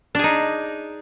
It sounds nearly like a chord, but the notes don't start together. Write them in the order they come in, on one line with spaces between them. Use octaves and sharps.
D4 G#4 D#4